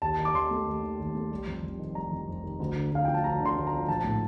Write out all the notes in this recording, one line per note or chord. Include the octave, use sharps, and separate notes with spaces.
D#2 A5
D#3
D6
D#2 C6
A3
D#2
D#3
D#2
A3
G3
F2
F1
D#3
G3 A#5
F2
F1
D#3
D2
D3
D2 F5
F3 G5
A5
D2 A#5
D3
C6
D2
A#5
F3
A#1 A5
A2